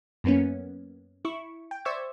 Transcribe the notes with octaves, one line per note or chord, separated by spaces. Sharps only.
F#2 A#3 B3 C#4
E4 C#6
G5
C5 D5 E5 C#6 E6 G#6